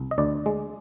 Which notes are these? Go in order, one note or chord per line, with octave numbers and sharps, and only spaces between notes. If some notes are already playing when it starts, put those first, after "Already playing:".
Already playing: C2
D#5
D2 D5
G#3